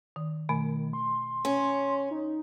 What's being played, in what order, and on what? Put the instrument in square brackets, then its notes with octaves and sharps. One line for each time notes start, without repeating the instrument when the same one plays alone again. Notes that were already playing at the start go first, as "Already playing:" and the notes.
[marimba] D#3
[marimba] B2 A3 [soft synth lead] D#3
[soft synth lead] C6
[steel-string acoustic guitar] C#4
[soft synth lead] D#4